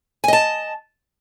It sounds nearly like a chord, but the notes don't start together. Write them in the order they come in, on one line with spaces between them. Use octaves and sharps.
G#5 D#5 A5